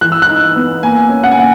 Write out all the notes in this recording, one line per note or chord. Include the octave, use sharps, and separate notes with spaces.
E3 F#6
E6
F#6
D#4
B3
A#3 G#5
C#4
F#5
G#5
A#3 F#5